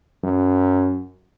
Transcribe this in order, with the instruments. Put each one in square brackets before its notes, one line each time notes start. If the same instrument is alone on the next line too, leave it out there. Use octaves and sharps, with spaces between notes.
[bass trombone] F#2